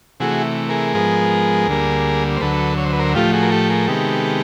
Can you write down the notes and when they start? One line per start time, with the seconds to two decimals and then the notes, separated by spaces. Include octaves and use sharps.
0.20 C3 E3 A3 F#4 G#4
0.69 G#4 A#4
0.94 G#2 F3 G#3 B3
1.67 D2 D3 G3 A#3
2.37 C5
2.40 D2 D3 F#3 A4 B4
2.77 C#5
2.85 C5
2.93 B4
2.99 A#4 C5
3.14 A2 F3 A3 F4 G4
3.33 F#4 G#4
3.42 A#4
3.52 G4 A4
3.69 G#4 A#4
3.88 C3 D#3 G#3 B3 G4 A4